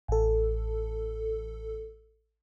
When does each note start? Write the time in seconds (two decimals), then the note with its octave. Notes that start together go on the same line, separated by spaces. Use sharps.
0.08 A1 A4